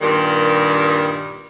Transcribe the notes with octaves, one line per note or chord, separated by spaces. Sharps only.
G2 A#2 D#3 G3